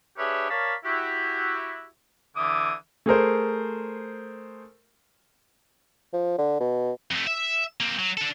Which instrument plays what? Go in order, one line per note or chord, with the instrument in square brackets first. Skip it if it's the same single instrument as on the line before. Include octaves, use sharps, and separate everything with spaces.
[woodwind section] D4 G4 G#4 B4 C#5 E5
A#4 C#5 D5 F5 A5 B5
E4 F#4 G4
D3 E3 E5 D6 D#6
[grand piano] A3 G#4 A#4 C5
[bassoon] F3
D3
B2
[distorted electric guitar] F2 A3
E5
A#3 C4
F#3
D4 A4